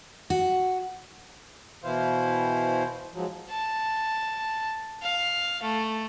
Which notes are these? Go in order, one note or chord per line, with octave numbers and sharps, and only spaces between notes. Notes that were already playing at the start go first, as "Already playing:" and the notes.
F#4
B2 E3 E4 C5 F5
G#2 F3 F#3
A5
F5
A3